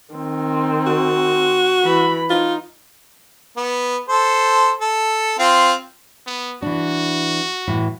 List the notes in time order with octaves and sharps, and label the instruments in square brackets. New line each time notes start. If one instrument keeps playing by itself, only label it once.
[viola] D#3 C4
[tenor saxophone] F#4
[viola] E3 B5
[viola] D#4 [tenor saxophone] F4
[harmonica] B3
A4 C5
A4
C4 F4
[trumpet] B3
[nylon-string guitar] E3 D4 [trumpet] F#4
[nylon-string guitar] A2 E3